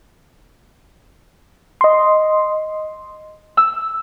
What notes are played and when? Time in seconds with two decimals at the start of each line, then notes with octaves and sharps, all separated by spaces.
1.81 D#5 C6
3.57 E6